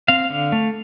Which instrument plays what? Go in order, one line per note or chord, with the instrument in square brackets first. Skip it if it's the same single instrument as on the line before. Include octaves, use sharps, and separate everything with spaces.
[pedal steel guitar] C4 F5
D3
A3